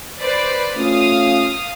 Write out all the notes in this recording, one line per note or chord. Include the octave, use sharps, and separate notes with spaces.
B4 C5 D5
A3 C#4 F4 F5 D#6